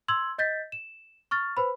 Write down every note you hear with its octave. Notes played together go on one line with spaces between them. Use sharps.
C6 E6 G#6 F#7
D#5 G6 A6 B6
E7
C#6 F6 A6
B4 C5 B5